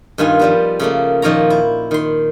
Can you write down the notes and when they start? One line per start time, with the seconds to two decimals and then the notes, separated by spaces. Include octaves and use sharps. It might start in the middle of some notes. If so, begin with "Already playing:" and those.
0.18 G2 D#3 F4 G#5
0.39 F3 G3 B3
0.80 C#3 A3 A#3
1.22 A#2 D#3 F3 C#5 A#5
1.50 E4
1.91 D#3 C6